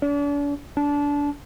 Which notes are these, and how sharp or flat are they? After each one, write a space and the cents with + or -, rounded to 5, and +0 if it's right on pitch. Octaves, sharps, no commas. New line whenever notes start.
D4 -40
D4 -25